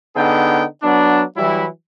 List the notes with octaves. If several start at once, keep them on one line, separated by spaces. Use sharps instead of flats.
D3 B3 D#4 G#4 G5
F#3 B3 D4
E3 F#3 G3 E4